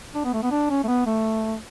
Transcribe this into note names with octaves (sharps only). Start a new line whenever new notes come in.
D4
B3
A3
B3
D4
C#4
A3
B3
A3